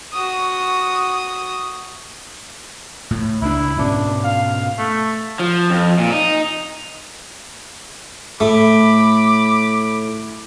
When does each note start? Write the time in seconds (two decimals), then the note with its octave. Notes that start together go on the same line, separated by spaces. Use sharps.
0.13 F#4 D#6
3.11 A2
3.42 C#2 D4 E4
3.79 G#2 B2 C#4 D4
4.24 F5
4.78 A3
5.40 F3
5.70 F2
5.98 A#2
6.12 D#4
8.40 A2 A3 B5 D6